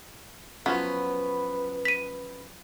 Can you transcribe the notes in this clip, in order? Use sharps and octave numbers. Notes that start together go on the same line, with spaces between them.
F3 F#3 B3 C#4 B4
B6 D#7